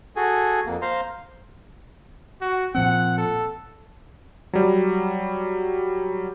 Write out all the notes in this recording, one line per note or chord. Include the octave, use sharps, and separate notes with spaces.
F#4 G#4 A4 G#5
F2 A#3
C5 F5 A#5 C6
F#4
A#2 F3 C4 F#5
A4
F#3 G3